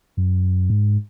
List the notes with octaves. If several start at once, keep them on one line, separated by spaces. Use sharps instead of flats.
F#2
G#2